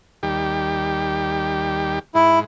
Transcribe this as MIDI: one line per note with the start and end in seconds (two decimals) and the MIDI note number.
0.23 1.99 39
0.23 1.99 55
0.23 1.99 67
2.15 2.44 44
2.15 2.39 64